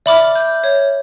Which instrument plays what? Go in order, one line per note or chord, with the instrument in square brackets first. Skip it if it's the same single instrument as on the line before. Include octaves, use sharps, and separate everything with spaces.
[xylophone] D5 B5 D6 [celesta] E5 F6
[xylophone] G6
C#5